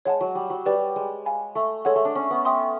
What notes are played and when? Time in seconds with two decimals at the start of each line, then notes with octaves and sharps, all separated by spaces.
0.05 G#3 C#5 F#5 A5
0.21 F#3
0.35 G3
0.50 F#3
0.66 G3 G4 B4 D5
0.96 G#3
1.26 F5 G#5 B5
1.55 A3
1.85 G#3 A4 C#5 F#5
1.96 A3
2.05 D4
2.15 C#4
2.31 B3
2.45 E5 G5 C6 D#6